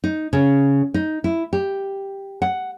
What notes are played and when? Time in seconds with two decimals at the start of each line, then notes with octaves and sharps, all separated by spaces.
0.04 D#4
0.33 C#3
0.94 D#4
1.24 E4
1.53 G4
2.42 F#5